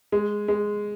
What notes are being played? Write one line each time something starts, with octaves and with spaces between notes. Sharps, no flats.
G#3
G#3